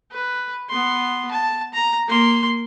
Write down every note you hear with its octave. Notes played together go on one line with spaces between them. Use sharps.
B4
B3 C6
A5
A#5
A#3 C6